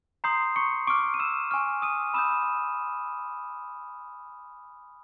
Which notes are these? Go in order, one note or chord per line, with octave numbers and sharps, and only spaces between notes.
A#5 C6 D#6 G6 C7
C#6 C#7
C#6 D6 F6 D7
D#7
E6 E7
G#5 C#6 F6
D#6 D#7
B5 D#6 E6 G6 E7